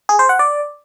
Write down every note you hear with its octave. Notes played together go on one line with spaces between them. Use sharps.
G#4
C5
F#5
D5